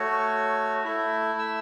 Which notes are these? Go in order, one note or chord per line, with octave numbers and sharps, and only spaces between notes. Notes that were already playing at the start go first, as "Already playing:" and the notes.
Already playing: A3 F#4 C#5
A3 E4 E5
E6